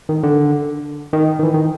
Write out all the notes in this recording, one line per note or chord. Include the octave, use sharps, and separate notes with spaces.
D#3
D3
D#3
D#3
E3
D#3